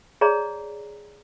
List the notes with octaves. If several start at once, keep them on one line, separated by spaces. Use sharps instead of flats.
G#4 C#5 D5 A#5